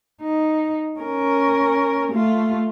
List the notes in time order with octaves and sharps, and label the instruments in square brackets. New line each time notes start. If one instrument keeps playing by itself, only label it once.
[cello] D#4
C#4 A#4
A3 F4